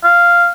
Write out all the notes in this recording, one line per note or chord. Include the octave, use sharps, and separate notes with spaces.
F5